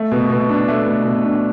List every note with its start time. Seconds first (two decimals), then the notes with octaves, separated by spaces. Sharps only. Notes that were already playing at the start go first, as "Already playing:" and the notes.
Already playing: A3
0.11 B2
0.30 B2
0.49 D4
0.68 A3
0.86 B2
1.05 B2
1.24 D4